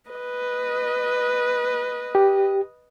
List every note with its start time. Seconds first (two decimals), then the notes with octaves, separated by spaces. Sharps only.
0.10 B4 D#5
2.15 G4